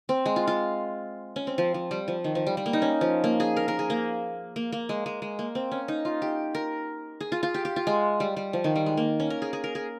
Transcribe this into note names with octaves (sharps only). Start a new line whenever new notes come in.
C4
G#3
F4
F4
C#4
C4
F3
F3
G3
F3
D#3
F3
G3
G3
A#3
D#4
C#4
F3
A#3
G#4
A#4
A#4
G#4
A#3
A#3
A#3
G#3
G#3
G#3
A#3
C4
C#4
D#4
F4
G4
A#4
G#4
F4
F4
G4
G4
F4
G#3
G3
G3
F3
D#3
G3
G#3
A#3
C#4
A#4
G#4
G#4
A#4
G#4